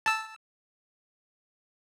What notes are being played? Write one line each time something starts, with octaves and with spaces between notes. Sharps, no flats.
A5 E6